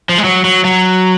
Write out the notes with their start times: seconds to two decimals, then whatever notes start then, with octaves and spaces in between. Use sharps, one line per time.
0.09 F3
0.18 G#3
0.24 F#3
0.45 F#3
0.65 F#3